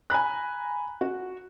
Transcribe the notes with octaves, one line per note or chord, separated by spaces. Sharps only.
G#5 A#5 B5 F#6
F#4